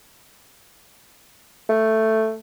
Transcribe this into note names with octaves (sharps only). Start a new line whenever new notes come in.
A3